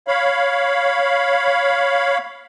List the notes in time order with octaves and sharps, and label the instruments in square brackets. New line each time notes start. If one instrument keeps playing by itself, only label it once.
[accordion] C#5 F5 B5